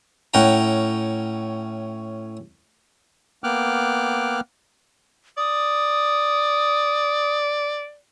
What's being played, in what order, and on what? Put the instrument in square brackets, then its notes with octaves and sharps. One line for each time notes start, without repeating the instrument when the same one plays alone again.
[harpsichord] A2 C#4 F#5 G5 A#5
[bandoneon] A#3 B3 G5 D6 F6 F#6
[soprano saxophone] D5 [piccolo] D#6